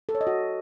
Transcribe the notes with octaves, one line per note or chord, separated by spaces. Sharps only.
A4
C#5
D#5
F#4